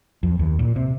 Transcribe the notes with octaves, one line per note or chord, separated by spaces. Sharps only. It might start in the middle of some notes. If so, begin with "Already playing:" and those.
F2
D#2
A#2
C3